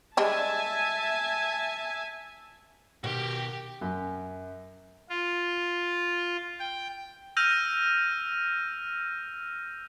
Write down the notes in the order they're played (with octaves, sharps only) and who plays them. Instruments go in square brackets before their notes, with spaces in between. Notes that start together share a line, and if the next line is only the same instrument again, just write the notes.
[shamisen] G3 G#3 D4 [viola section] E5 G#5 A5
[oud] B2 D#3 [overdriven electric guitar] F#4 G5 [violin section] G4
[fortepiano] F#2
[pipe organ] F4
G5
[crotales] E6 F6 G6 A#6 D#7 F7